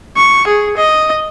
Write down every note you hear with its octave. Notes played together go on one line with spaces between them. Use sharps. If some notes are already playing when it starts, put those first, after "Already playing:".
C#6
G#4
D#5